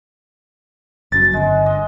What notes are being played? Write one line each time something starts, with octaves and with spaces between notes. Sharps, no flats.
F#1 F#2 A6
G1 G#3
D#5